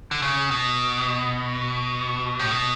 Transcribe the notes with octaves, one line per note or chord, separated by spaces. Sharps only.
D3
C#3
B2
A2
B2